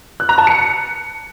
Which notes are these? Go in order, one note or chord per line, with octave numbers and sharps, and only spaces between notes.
F#6
A#5
A5
C#7